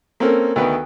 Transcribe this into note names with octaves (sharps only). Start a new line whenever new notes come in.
A#3 C4 C#4 A4 A#4
D2 D#3 B3 B4